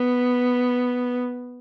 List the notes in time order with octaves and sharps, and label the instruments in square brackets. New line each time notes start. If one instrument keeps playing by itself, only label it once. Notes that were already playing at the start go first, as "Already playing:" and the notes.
Already playing: [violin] B3